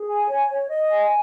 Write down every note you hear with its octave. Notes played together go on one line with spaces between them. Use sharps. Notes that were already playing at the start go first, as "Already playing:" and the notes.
Already playing: G#4
G#5
C#5
C#5
D#5
G#5